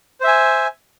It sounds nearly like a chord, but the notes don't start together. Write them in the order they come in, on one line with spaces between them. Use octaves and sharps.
C5 E5 G#5